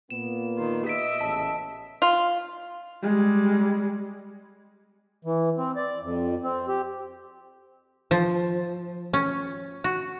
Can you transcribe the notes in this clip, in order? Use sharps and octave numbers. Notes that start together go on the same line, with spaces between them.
A#2 A#3 B3 E7
D#3 F4
D#5 E5 B6 D7
A1 C#3 A5
F4
G3 G#3
E3
C4
D5
F2
C4
G4
F3
C#4
F#4